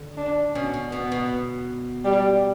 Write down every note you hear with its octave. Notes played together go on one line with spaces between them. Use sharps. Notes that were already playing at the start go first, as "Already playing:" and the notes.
Already playing: D3
D4
B2 C#4
B2
B2 B3
B2
G3